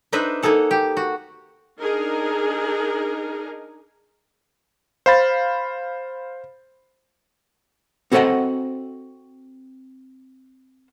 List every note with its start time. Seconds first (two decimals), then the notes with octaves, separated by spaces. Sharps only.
0.13 D4 D#4 B4 C5 D#5 E5
0.42 A#3 D#4 G#4 A4 F#5
0.71 G4
0.97 F#4
1.79 D4 D#4 G#4 A#4
5.06 C5 F5 B5 A6
8.12 C4 F#4 A4 C5 D#5 F#5